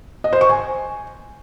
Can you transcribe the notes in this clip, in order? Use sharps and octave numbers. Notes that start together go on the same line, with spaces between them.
D#5
C5
C#6
G#5